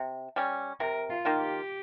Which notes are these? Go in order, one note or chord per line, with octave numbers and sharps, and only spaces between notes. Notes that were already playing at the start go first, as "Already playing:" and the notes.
Already playing: C3
G3 C#4
C3 A#4
F4
D#3 A#3 F4
G4